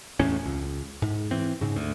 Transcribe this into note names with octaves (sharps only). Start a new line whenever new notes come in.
A1 E2 A2 C#4
C#2
G#2
E3 C4
G#2 C#3
D2